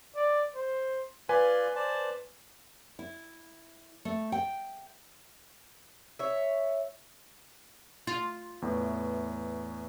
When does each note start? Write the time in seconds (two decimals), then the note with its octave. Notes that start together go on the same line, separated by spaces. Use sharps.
0.15 D5
0.55 C5
1.29 F4 B4 D5 G#5 C6
1.76 C5 D5 A5
2.99 E4
4.05 A3
4.32 G5
6.19 C#5 E5
8.07 F4
8.62 E2 A2 E3